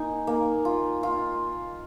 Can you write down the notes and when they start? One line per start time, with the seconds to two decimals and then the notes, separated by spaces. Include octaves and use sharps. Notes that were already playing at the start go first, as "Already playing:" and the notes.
Already playing: A#3 D#4 G#5
0.27 A#3
0.65 F4
1.03 F4